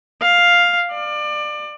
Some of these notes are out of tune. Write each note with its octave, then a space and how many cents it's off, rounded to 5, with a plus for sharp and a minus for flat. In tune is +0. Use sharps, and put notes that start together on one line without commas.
F5 +5
D5 +25